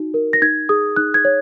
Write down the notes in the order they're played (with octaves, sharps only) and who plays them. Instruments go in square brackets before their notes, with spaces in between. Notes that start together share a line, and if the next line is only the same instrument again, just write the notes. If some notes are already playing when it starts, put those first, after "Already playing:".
Already playing: [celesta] D#4 F#4
A#4
A#6
D#4 G#6
G#4 D#6
D#4 F#6
G#6
C#5